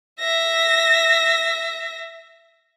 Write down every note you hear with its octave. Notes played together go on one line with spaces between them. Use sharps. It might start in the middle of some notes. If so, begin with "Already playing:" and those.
E5 A#6